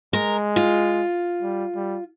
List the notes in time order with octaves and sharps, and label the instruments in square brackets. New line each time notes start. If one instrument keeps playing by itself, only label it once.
[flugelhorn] G#3 [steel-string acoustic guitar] A#4
[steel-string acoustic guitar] F4
[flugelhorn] G3
G3